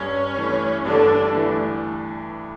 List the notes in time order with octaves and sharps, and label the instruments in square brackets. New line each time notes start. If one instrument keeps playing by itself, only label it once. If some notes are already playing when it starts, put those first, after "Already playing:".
Already playing: [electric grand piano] G2 [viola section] C#4
[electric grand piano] E3 A3 D4
[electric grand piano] G2 [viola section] D3 D4
[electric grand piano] E3 A3 D4